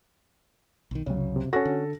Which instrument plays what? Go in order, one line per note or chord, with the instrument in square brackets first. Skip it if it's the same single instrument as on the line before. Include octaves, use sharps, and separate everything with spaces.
[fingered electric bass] B1 D#3
[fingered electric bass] C2 [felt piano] F#2 C#3
[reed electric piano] C3
[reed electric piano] C#4 F#4 [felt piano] A4 A#6
[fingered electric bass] D3